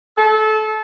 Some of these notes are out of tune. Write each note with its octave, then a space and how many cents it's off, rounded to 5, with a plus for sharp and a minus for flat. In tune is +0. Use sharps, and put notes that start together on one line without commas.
A4 -25